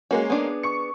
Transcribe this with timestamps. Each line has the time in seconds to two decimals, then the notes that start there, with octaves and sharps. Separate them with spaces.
0.11 G#3 A#3 C#4 F#4
0.30 B3 D4 G#4
0.63 C#6 C#7